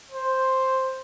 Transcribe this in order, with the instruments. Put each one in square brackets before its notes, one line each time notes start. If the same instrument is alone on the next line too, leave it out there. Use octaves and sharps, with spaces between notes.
[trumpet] C5